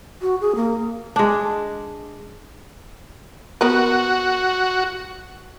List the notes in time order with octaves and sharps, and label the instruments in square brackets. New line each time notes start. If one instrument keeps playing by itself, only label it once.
[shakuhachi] F#4
G#4
A#3
[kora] G#3 D4
[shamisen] B3 A#4 B4 [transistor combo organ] F#4